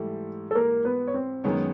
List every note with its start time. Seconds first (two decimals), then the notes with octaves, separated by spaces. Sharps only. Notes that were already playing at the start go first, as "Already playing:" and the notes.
Already playing: G#2 E3 G3 A3 A4
0.51 A4
0.55 A#3 A#4
0.85 B3 B4
1.07 C#5
1.14 C4 C5
1.44 F#2 D#3 G#3 B3 C#4 C#5